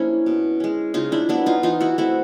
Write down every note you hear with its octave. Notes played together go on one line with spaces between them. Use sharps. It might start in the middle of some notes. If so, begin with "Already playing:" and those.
Already playing: F3 A#3 C#4 D4 E4
B2
G#3 C#4
C#3 D#4 F4
D4 E4
F#3 B3 D4 E4
D#4 F4
E3 D#4 F4
E4 F#4
A3 C4 E4 F#4